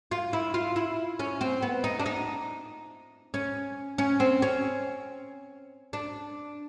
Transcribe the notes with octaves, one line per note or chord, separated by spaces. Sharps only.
F4
E4
F4
E4
C#4
C4
B3
D#4
D4
D#4
C#4
C#4
C4
C#4
D4